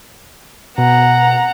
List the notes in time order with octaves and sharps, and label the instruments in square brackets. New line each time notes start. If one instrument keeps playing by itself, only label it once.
[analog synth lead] B2 [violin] F#5 A#5